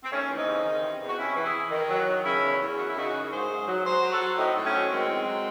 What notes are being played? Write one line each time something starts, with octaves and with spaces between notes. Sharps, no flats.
C4
D#2 A3 C#4
E3
C4 D#4
C#3
D#3
C3
E2
F#4
C3 C#4 E4
E3
E4 G#4
E3
D#3
F#3
D#3
C#3 C#4 E4
E2
E2
F#2 F#4
E4
C#3 D#4 F#4
F#2
G#2 G#4 C5
G#2
F#3
F#3 G#4 C5
F#3
F#4 A4
F#3
A2 C4 D#4
A2
A3 C#4
F#3
D#3 G#3 C4
E2
F#3